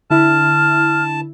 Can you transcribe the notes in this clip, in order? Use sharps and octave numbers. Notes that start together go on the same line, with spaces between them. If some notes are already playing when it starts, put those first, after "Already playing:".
D3 E4 A5 F6